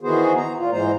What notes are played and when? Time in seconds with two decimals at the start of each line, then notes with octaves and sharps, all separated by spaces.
0.01 D#3 E3 B3 F#4 G#4 C5
0.36 A#5
0.58 A#2 F4
0.72 G#2 E3 G#3 C5 A#5